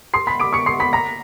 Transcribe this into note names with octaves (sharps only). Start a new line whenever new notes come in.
C6 C7
B5 B6
D6 D7
C#6 C#7
C6 C7
B5 B6
A#5 A#6